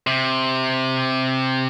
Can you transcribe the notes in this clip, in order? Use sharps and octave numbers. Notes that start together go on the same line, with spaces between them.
C3